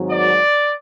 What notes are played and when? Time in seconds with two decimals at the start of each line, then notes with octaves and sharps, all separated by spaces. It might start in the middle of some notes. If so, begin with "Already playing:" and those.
Already playing: G#1 G#2 F#3
0.10 D5